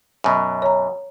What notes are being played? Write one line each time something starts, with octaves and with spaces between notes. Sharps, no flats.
F#2 B2
C#5 A#5